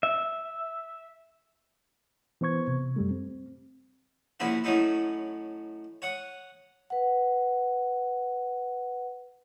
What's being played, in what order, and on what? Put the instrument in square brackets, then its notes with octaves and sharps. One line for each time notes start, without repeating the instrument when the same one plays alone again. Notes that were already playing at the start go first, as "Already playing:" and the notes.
[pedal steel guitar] E5
[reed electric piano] E3 B3 C5 C#6 G#6
C3
F#2 G3 A3
C4
[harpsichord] A#1 C3 C#4 E4 F#4 E5
A2 F#3 C#4 D#4 E4
C#5 F#5 D#6
[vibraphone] B4 F#5